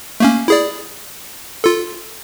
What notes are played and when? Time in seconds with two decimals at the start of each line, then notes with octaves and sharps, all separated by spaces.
0.20 A3 A#3 C#4
0.48 E4 G#4 D5
1.64 F4 A4